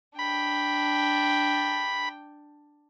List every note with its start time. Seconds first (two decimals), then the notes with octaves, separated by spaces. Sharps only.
0.19 D4 G5 B5